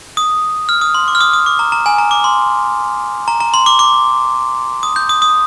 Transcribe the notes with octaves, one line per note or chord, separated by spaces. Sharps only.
D#6
F6
D#6
C6
D6
F6
D#6
D#6
D6
A#5
A#5
G#5
A#5
D6
C6
A#5
A#5
C6
D6
D6
D#6
G6
D#6
D#6